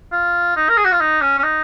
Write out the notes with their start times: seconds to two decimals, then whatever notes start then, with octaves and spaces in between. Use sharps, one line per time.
0.12 F4
0.56 D#4
0.69 A#4
0.77 G#4
0.85 F#4
0.92 F4
1.00 D#4
1.21 C#4
1.38 C#4
1.43 D#4